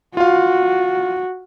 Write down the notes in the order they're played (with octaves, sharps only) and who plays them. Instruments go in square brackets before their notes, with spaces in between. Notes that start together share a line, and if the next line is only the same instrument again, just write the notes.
[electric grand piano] F4 F5 [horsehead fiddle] F#4